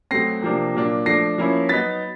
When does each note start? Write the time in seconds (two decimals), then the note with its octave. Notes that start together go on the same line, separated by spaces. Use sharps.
0.11 B2 F#3 A3 C4 A#6 C7
0.42 C3 F3 A#3 D4
0.75 A#2 F#3 A#3 D4
1.06 F3 A3 D4 A#6 C7
1.38 F3 A#3 C#4 E4
1.69 F#3 B3 D#4 A6 B6